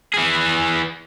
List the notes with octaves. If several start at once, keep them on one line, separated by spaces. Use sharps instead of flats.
E3 G#4